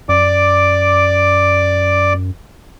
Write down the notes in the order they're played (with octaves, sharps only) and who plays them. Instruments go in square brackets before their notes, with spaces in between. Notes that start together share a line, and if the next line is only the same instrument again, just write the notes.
[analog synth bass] F#2 [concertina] D5 D6